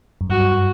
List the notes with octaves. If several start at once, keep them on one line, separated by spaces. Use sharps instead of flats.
F#2
G2 F#4